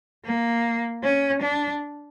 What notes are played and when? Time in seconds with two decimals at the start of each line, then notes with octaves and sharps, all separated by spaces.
0.25 A#3
1.03 C#4
1.42 D4